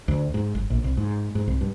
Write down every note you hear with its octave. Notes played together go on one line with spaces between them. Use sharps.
D2
G#2
G1
A#1
C2
G#2
G#2
C2
G2